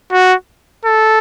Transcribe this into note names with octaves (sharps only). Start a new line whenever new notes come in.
F#4
A4